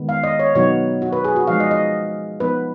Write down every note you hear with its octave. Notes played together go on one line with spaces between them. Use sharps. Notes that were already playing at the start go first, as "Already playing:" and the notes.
Already playing: D#3 G#3 B3
F5
D#5
C#5
B2 F#3 B3 D#4 C#5
F#4
B4
G#4
F#4
F3 G#3 D#4 F5
D#5
D#5
F3 B3 D#4 B4